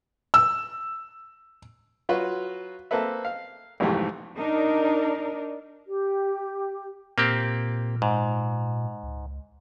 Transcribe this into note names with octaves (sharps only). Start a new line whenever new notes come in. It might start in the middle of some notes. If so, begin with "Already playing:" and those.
E6
F#3 F4 F#4 B4
A#3 C4 A4 B4 E5
F5
B1 F2 G#2 C3 E3 A3
D4 D#4 A#4 D5
G4
A#2 A#3 C4 G4
G#2
C#2